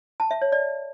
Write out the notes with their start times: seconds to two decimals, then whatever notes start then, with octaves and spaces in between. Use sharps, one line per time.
0.20 A5
0.31 E5
0.41 C#5
0.52 D5